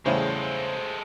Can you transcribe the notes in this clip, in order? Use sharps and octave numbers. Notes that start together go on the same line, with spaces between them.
E2 A2 C#3 G3 G#3 A4 C5